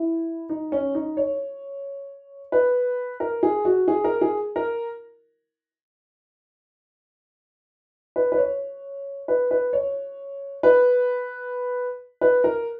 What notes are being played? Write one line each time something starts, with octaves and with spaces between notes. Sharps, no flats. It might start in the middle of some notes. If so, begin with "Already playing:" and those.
Already playing: E4
D#4
C#4
D#4
C#5
B4
A#4
G#4
F#4
G#4
A#4
G#4
A#4
B4
B4
C#5
B4
B4
C#5
B4
B4
A#4